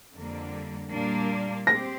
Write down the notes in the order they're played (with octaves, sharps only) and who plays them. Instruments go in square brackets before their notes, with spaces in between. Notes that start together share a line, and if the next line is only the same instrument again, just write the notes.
[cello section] F2 D3 G3 A#3
A#2 G3 A#3 D4
[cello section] C4 G4 C5 [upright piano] A#6